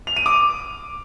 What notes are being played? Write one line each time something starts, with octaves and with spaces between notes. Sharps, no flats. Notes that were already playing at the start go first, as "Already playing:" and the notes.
F7
D#7
D6